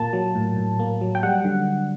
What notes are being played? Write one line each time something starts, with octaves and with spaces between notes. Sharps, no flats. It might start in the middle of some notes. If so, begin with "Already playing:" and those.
Already playing: A#2 A#3 A5
F#3
A2
A2
A#3
F#3
G5
G3 F#5
D3